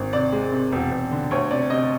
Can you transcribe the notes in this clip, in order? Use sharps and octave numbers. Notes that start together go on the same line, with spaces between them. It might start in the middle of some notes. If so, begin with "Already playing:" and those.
Already playing: G#1
C3 D5
G#3
C3
E1
E1
D3
D2 C#5
C3 D5
C3 D#5